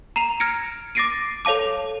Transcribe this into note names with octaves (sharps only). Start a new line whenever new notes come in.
A#5 C7 D#7 F7
F6 G#6 A#6 C#7 D7
D6 A6 A#6 C7 D7 D#7
A4 C#5 F5 A5 D6